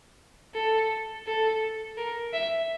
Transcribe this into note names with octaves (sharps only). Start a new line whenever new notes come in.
A4
A4
A#4
E5